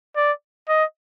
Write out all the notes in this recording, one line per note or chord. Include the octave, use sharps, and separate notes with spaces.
D5
D#5